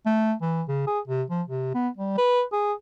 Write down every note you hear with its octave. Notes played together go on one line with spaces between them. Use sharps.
A3
E3
C#3
G#4
C3
F3
C3
B3
G3
B4
G#4